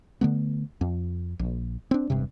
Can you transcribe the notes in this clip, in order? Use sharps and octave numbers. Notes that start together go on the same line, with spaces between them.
D3 A3 B3
F2
A#1
C4 D4
E1 G2 C3